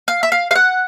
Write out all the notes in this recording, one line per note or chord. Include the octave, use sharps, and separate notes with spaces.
F5
E5
F5
F5
F#5